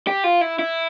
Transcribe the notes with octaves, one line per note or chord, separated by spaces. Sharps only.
G4
F4
E4
E4